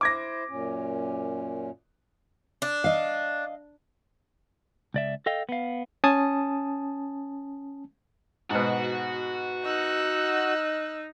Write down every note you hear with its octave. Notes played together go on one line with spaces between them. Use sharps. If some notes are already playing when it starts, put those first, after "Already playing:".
E4 C5 D6 G#6 A#6
F#2 A#2 C#4
D4
D#5 F5
C#2 D5 E5
A4 D#5 F5 G5
B3 F5
C#4 G#5 A5 D#6
G#2 B2 F#4 F#5
D#4 E6 F#6